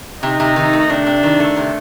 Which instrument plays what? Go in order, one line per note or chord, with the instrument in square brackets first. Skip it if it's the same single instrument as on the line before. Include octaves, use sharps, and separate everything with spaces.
[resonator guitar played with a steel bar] C3 [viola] D#4
[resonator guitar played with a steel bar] C3
D#3
A3
[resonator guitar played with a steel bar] C3 [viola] D4
[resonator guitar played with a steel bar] C3
D#3
A3
C3